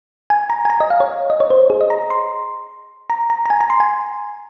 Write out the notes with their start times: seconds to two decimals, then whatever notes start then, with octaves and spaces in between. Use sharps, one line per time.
0.30 G#5
0.50 A#5
0.65 G#5
0.70 A#5
0.80 D#5
0.90 F5
1.00 C#5
1.30 D#5
1.40 C#5
1.50 C5
1.70 G#4
1.81 D#5
1.90 A#5
2.10 C6
3.10 A#5
3.30 A#5
3.46 A#5
3.50 G#5
3.61 A#5
3.70 C6
3.80 G#5